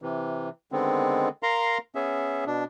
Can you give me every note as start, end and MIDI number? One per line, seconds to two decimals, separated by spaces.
0.02 0.49 48
0.02 0.49 52
0.72 1.29 50
0.72 1.29 51
0.72 1.29 56
0.72 1.29 59
0.72 1.29 60
1.43 1.78 70
1.43 1.78 77
1.43 1.78 82
1.43 1.78 84
1.95 2.44 59
1.95 2.44 61
1.95 2.44 68
1.95 2.44 76
2.47 2.64 47
2.47 2.64 62